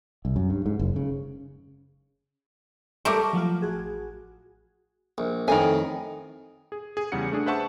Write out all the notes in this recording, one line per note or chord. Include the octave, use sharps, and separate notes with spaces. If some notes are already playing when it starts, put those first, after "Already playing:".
C2
F#2
G2
G#2
F#1
C#3
G3 A3 A#4 C#6 D6
F3 F#3 A3 F4
A1 F#4 G#4
A#1
F2 A2 D#3 G#5
G#4
G#4
E2 C#3 G3 F#5 C#7
A3 D4 G#4
B4 C5 E5 F#5 A5 C#6